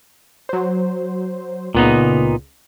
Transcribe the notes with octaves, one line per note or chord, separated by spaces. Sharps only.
F#3 C5
C#2 A#2 C#3 B3 D#4